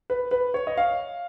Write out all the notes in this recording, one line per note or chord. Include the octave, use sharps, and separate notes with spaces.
B4
B4
C#5
D#5
F5